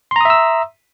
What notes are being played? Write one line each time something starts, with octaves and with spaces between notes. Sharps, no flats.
E5 A#5 C6 D#6 E6